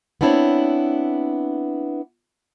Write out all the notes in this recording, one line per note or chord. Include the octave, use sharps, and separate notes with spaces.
B3 C4 D4 E4 C#5